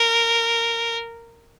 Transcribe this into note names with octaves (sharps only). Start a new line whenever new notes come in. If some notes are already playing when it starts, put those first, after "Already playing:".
Already playing: A#4